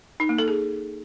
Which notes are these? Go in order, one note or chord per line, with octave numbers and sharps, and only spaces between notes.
D#4
A#3
A4
G#4